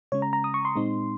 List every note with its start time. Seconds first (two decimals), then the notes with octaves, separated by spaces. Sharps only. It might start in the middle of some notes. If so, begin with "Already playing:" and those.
0.12 C#3 G#3 C#4 C#5
0.22 A#5
0.33 A#5
0.44 D#6
0.54 C#6
0.65 C6
0.76 A#2 G#3 C4 D#4